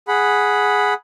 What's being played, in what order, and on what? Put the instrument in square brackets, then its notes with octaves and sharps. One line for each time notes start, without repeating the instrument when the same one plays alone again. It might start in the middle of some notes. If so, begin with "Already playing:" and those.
[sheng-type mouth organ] G#4 F#5 B5